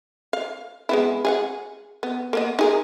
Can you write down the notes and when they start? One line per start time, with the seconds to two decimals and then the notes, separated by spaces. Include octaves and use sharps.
0.33 F5
0.89 G#3 B3 E4
1.25 G#4 F5 F#5
2.03 B3
2.33 A#3 B3 D#5
2.59 D#4 G#4 A#4